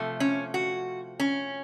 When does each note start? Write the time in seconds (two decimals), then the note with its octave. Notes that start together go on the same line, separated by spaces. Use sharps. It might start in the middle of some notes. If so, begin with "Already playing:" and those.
Already playing: C3 F3 A3
0.20 C#4
0.54 F#4
1.20 C#4